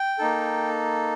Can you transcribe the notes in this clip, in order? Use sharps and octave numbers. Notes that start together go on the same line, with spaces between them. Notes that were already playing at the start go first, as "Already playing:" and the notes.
Already playing: G5
A#3 D#4 A4